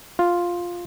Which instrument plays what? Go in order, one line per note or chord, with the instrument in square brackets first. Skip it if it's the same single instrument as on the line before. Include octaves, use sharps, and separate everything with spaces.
[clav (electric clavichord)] F4